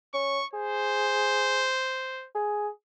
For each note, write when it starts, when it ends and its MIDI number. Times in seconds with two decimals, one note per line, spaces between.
0.14 0.40 61
0.14 0.46 85
0.53 1.71 68
0.53 2.28 72
2.35 2.68 68